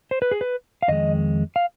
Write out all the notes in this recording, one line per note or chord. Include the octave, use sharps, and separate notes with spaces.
C5
B4
G#4
B4
F5
F2 D#3 G#3 D#5
F5